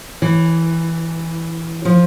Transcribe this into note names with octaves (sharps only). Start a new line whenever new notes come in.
E3
F3